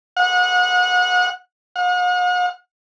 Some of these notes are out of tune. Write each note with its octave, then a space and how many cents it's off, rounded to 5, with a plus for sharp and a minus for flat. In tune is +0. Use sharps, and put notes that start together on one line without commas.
F#5 -30
F#5 -45